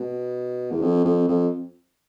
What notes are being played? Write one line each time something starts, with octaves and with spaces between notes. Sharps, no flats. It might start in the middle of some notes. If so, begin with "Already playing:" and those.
Already playing: B2
E2
F2
F2
F2